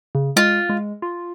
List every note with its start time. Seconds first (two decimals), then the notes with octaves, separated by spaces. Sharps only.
0.15 C#3
0.36 G#3 F4
0.69 G#3
1.02 F4